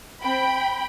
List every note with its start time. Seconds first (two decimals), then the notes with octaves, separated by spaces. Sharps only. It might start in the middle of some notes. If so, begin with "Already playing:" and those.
0.23 C4 G5 B5